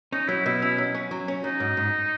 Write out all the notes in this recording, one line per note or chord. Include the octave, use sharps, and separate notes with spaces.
C#4 D#4
F#3 E4
B2 E4
C#4 E4
F#3
C#4
F#3
C#4
F#3 D#4
G#2
G#2